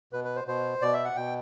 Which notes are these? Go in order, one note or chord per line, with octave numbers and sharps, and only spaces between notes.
B2 B4
B4
C5
B2 C5
B2 D5
E5
F#5
B2 G5